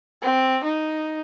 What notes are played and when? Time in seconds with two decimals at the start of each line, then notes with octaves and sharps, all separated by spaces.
0.22 C4
0.64 D#4